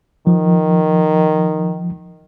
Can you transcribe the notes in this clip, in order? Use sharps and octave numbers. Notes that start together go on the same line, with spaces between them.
D#3 F3